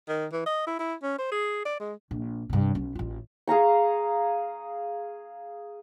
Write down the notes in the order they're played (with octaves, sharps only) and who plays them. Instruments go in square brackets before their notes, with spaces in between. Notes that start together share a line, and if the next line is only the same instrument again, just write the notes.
[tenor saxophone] D#3
E3
D#5
E4
E4
C#4
C5
G#4
D5
G#3
[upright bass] A#1
G2 C3
B1 C#4
A1 F4
[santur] G#4 F5 A#5 C#6